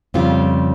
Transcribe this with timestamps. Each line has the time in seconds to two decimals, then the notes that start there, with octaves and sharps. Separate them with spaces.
0.14 F2 C#3 G3 C4 F4